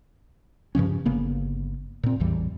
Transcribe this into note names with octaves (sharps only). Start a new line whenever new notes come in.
G2 C#3 F3 C#4
G1 C#3 A#3 B3
A#2 C4
A1 E2 E3 G3